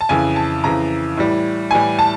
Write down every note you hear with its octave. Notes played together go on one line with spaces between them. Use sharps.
A5
F2 C#3 E3 G#5
A5
F2 C#3 E3 A#5
A2 E3 G3
A2 E3 G3 G#5
A5